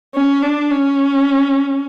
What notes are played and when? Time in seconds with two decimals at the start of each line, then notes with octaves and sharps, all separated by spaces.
0.15 C#4
0.42 D4
0.70 C#4